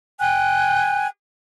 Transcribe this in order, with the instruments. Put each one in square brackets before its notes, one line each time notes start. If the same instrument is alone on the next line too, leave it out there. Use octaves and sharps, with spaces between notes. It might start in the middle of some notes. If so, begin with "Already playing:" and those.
[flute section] G5 G#5 F#6